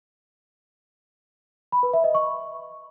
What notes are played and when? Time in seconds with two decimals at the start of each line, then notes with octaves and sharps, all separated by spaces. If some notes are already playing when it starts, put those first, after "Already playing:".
1.72 B5
1.83 B4
1.93 E5
2.04 D#5
2.15 C#6